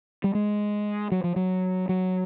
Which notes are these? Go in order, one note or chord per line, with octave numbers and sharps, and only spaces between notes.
G3
G#3
F#3
F3
F#3
F#3